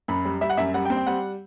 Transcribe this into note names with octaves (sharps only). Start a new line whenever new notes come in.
F#2 B5
G3
G3 E5
F#5
F#2 E5
G3 F#5
G5
C4
G5
G3 F#5